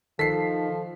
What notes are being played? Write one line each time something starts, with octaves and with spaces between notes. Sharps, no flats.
D#3 F3 A4 B6 C7